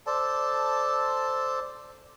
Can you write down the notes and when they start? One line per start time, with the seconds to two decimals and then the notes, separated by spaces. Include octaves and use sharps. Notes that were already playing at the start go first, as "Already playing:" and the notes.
0.07 A4 C5 D5 A5